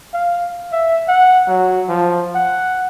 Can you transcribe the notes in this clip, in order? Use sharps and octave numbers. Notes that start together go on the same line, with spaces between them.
F5
E5
F#5
F#3
F3
F#5